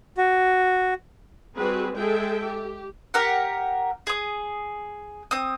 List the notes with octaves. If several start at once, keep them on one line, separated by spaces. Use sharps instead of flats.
F#4
G3 C4 F#4 G#4 B4
G#3 G#4 A4 E5 G5
G4
G4 A#4 F#5
G#4 D#6
C4 D#6